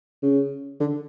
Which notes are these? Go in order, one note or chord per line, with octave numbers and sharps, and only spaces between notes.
C#3
D3